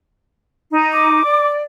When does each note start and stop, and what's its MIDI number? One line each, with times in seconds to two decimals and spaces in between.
0.70 1.22 63
0.93 1.49 86
1.23 1.61 74